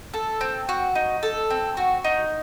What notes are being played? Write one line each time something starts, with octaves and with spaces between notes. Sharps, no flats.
A4
C4
F#4
D#4
A4
C4
F#4
D#4